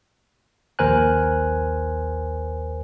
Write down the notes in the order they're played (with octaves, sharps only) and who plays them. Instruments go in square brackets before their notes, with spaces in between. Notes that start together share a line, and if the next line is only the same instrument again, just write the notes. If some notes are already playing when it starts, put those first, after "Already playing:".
[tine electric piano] A#1 D#2 A#4 C5 G#5 F#6